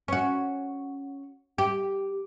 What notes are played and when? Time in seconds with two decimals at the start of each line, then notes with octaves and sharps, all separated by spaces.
0.08 C#4 F#4
1.58 G4